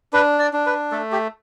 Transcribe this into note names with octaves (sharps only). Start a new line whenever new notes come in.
D4 B4
D5
D4
B4
A3 A4
G4